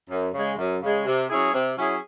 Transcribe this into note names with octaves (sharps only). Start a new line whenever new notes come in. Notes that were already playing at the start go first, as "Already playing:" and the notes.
F#2
C#3 G#3
F#2
C#3 G#3
C3
F#3 C#4 E4 G#4
C3
F#3 C#4 E4 G#4